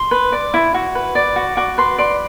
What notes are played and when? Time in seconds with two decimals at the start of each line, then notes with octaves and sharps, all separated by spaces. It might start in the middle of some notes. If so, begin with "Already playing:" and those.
Already playing: C6
0.11 B4
0.32 D5
0.54 E4
0.74 F#4
0.95 B4
1.15 D5
1.36 F#4
1.57 F#4 D6
1.78 B4 C6
1.98 D5 C6